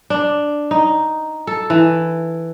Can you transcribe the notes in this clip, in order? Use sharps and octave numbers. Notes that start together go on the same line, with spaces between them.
D4
D#4
A4
E3